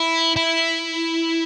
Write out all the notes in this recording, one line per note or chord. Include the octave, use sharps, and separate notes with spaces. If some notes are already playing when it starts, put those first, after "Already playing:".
Already playing: E4
E4